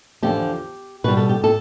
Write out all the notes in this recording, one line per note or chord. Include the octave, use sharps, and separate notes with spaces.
E2 D3 F3 G4
B2 G3 B4
A4
G4
A4